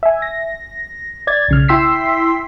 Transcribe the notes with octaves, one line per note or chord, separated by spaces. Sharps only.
E5 G#5
A#6
D5 G#6 A6
B1 C#3 F6
E4 G5 C6 E6 B6 C7